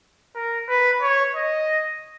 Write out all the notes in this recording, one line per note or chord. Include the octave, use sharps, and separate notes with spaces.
A#4
B4
C#5
D#5